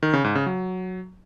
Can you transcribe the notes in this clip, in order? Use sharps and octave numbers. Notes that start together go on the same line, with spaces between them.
D#3
C#3
G#2
C#3
F#3